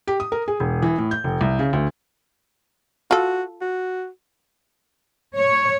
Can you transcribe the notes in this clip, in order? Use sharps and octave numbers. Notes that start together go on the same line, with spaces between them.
G4
D#6
A#4
G#4
E1
E3
A2
G6
F1
C2
C#3
D2
F4 F#4 A4
F#4
C#5